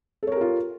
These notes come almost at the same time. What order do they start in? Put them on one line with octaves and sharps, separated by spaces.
A4 C#5 A#4 G4 F4